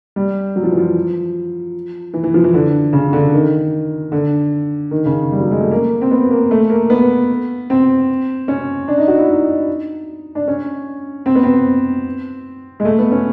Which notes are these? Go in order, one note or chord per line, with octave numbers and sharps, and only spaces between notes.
G3
F#3
F3
E3
F3
E3
E3
F3
E3
D3
C#3
D3
D#3
D3
D#3
C#3
G3
F#3
G#3
A3
A#3
C4
B3
A#3
A3
A#3
B3
C4
C#4
D4
D#4
F#4
E4
D#4
D4
C#4
C4
B3
C4
G#3
A3
B3
C#4